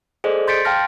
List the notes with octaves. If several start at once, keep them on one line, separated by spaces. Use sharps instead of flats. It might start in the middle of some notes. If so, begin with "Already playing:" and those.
G#4 A4 C5 D5 D#5
C6 G6 A6 B6 C#7 D7
F5 G5 A5 C6 F6 A#6